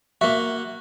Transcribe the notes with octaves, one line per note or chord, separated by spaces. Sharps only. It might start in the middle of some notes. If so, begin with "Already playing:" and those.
A#3 F#4 E5